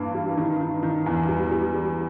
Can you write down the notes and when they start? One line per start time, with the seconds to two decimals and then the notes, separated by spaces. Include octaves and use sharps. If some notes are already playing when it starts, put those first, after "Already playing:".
Already playing: G2 E3 A#3
0.15 G3
0.37 D#3
0.61 D#3
0.83 D#3
1.06 E2
1.29 G3
1.51 G3
1.74 G3